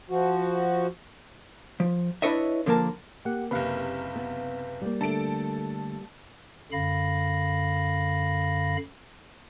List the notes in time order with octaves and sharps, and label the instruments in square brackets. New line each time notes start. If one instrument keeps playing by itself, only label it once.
[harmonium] F3 F#4
[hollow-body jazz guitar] F3
D4 E4 B4 C#5 D#5 E5
D3 F3 A#3 A#4 A5
[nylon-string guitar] A#3 [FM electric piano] G4 F#5
[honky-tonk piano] F#1 C3 [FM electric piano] B4 F5
[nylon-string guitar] B3
G3 A#3
[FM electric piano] D3 A3 [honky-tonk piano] A4 D7
[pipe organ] F#2 D3 F5 B5 A#6